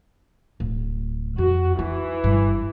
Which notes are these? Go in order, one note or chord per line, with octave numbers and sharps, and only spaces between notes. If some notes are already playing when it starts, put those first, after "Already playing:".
D1
F2 F#4
E3 D#4
G1 G2